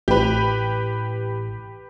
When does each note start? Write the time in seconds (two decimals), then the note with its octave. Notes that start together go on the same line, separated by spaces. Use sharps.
0.08 A1 G4 B4